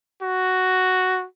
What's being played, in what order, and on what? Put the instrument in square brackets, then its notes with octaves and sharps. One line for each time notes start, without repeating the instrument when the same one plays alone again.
[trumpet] F#4